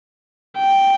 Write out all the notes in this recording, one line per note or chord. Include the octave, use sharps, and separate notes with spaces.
G5